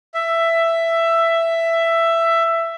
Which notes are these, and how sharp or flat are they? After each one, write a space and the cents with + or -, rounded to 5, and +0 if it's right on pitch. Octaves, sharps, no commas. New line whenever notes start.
E5 +10